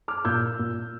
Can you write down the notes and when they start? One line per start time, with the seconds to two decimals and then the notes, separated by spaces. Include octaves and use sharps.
0.08 D6 F6
0.25 A#2 E6 G6
0.59 A#2